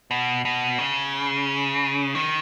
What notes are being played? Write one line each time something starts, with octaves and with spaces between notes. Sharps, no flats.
B2
B2
C#3
D#3